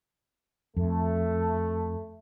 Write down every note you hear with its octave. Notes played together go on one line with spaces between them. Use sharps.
F2 A3